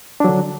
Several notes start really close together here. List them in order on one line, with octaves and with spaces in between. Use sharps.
D4 F#3 D3